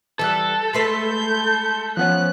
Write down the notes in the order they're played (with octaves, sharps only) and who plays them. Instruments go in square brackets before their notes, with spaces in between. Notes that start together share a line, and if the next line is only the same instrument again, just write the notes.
[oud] E3 G3 [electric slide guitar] A4 [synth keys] E6 F#6
[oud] G#3 A3 B4 [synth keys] B5 C6 B6 [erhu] G6
[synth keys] F3 B3 C#4 [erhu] F#6